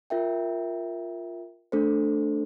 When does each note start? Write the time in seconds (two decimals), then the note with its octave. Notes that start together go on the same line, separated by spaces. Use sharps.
0.10 F4 A#4 E5 G5
1.72 A3 D4 A4 C5